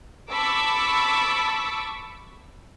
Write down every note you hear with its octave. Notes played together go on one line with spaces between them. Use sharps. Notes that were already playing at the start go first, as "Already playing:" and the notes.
A5 B5 C#6 D6 E6